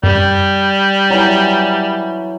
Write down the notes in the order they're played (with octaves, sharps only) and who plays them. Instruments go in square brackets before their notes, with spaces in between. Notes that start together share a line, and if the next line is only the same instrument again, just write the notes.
[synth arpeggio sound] F#2 [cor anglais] G3
[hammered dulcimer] E3 F#3